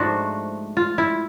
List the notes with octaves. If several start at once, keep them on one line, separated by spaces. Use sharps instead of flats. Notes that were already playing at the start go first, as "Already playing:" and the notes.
Already playing: G#2 F3 A3 D4 F#4
F4
E4